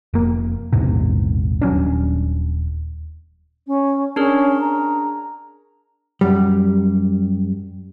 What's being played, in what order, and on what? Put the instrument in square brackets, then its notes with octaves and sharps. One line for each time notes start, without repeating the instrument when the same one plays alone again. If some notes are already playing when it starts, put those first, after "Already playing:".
[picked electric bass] F1 A#3
A#1 E2 G#2 C3
D#1 F#3 C#4 D4
[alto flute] C#4
[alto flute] C#4 [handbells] D4 G#4 A#4
[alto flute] A#5
[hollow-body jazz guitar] F#2 G3